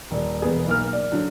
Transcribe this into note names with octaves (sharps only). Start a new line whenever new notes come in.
D#1 D5
E1 B3 G#4
B1 A#3 A#4 F6
D5
D3 F#3